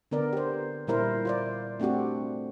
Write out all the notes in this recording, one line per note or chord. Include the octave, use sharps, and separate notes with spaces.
D3 B3 A#4 D5
G4 C5
A#2 G3 E4 A#4 C5
F4 C5 D5
A3 C4 D4 F#4 G4